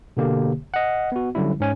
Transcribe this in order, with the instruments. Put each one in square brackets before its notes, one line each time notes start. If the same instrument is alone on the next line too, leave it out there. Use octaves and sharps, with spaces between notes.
[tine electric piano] B2 D3 A#3 G4
D#5 F#5
B3 F#4
D3 F#3 G3 C#4 E4
G#2 C#4 G#5